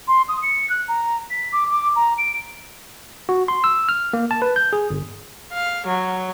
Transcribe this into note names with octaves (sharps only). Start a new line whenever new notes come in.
C6
D#6
C#7
F#6
A#5
B6
D6
D6
A#5
D7
F#4
C6
E6
F6
A#3
A5
B4
G6
G#4
G1
F5
F#3